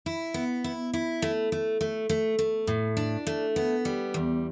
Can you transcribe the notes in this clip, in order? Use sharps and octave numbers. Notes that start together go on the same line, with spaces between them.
E4
B3
E4
E4
A3
A3
A3
A3
A3
A2
D4
A3
B3
G3
E2